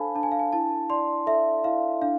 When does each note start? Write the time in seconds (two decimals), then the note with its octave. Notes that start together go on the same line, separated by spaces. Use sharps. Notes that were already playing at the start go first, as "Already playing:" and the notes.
Already playing: D4 A4 C5 F5 G#5 A5 B5
0.15 D4 A5
0.23 G#5
0.32 F5
0.39 G#5
0.53 E4 A5
0.90 D5 C6
1.27 A4 E5
1.64 E4 F5
2.02 D4 F5